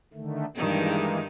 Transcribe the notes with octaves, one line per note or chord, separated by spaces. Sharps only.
D3 D#3 A3
G2 D#3 E3 G#3 A#3 D#4